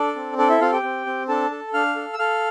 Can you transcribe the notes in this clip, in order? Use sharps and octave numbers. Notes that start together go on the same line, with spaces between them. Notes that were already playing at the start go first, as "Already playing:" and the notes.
Already playing: D4 A4 D5
C4
D4 A4 D5
E4 E5
C4 F4 F5
G4 G5
C4
C4
D4 A4 A5
A4
D4 F5 F6
A4
E6
A4 F5 F6